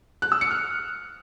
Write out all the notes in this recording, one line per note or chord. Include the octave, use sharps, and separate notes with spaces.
F#6
E6
C#7
F6